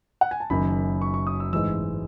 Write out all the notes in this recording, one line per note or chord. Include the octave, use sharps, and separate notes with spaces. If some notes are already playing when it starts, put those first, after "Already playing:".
F#5
G#5
A5
F#1 F#2 D#3 B5
C#6
C#6
D#6
E6
A1 G#2 E3 G#3 E6